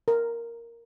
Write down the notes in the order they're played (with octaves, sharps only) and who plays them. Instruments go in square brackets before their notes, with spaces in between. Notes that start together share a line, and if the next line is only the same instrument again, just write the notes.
[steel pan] A#4